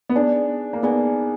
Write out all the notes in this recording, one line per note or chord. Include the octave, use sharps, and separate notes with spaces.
B3
D4 D#4 G#4 D5 G#5
A#3
B3 D#4 G#4 D5 G#5